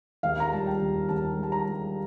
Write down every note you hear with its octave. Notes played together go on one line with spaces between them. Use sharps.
D#2 F5
A#5
G3 A5
G5
D#2
D#2 A5
G3
A5
A#5
G3